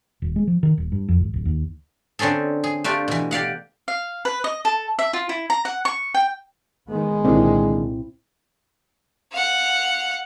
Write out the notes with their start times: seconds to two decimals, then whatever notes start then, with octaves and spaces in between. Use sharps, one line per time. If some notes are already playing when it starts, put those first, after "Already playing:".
0.22 D#1
0.36 G#3
0.47 F3
0.63 D#3
0.78 D#1
0.92 G2
1.09 F2
1.20 G#1
1.34 D1
1.45 D#2
2.19 D3 C4 C#4 G#4 A4
2.64 G#4
2.84 A3 D4 F4 G4
3.08 B2 E3
3.31 G4 D5 F5 F#5
3.88 F5
4.25 B4
4.44 D#5
4.65 A4
4.99 E5
5.13 F4
5.29 E4
5.50 A#5
5.65 F#5
5.85 C#6
6.14 G5
6.90 D#3 G#3 B3
7.25 C2 A#2 D3 D#3 C4 E4
9.32 F5 F#5